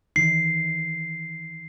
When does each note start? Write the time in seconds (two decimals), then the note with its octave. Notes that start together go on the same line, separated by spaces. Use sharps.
0.16 D#3 E3 D#4 C7